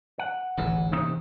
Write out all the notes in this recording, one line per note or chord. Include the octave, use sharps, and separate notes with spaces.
F#5
D1 A1 G#2 E3
C3 A#3 D#4